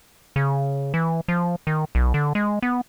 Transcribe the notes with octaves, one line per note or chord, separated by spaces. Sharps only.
C#3
E3
F3
D#3
B1
D3
G#3
B3